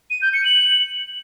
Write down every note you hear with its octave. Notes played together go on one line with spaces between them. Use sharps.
D#7
G6
C#7
F#7